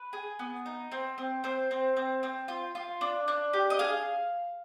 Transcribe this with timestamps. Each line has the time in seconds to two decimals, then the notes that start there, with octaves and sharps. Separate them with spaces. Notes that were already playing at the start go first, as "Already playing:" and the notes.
Already playing: B4
0.13 G#4
0.39 B3
0.66 D#4
0.92 C4
1.18 C4
1.44 C4 C5
1.71 C4
1.96 C4
2.23 C4
2.48 F4
2.75 F4
3.01 D4
3.28 D4
3.53 G4
3.70 D#5
3.79 G#4 F5